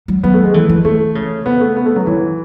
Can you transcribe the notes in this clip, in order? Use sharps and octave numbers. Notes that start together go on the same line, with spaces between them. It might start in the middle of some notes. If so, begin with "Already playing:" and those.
F#3
F#3 B3
A3
G#3
E3 A3
E3
E3 A3
C#3
C#3 B3
A3
B3
A3
F#3
E3 F#3